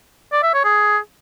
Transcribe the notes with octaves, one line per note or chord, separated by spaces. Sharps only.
D5
E5
C#5
G#4